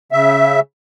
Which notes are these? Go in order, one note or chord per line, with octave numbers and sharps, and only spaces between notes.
C#3 E5